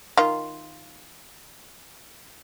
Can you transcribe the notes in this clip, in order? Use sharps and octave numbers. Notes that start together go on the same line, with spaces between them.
D#3 F4